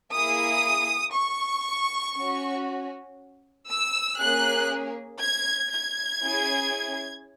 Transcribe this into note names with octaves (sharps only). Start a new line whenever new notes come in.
A#3 E4 G#4 D#6
C#6
C#4 F#4
E6
A#3 C#4 G#4 F#6
G#6
G#6
C#4 E4 G#4